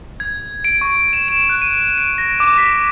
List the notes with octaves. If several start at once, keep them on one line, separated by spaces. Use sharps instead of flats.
G#6
D7
C#6
E7
E7
F#6
D#7
D7
A#6
D6
B6